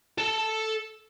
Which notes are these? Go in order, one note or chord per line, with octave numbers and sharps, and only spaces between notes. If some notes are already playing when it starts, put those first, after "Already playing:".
A4 A5